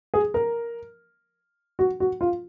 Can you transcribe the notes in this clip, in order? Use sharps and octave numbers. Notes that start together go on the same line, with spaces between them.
G#4
A#4
F#4
F#4
F4